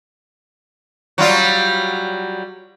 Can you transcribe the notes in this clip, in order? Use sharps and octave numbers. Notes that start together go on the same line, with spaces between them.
F#3 G3 F4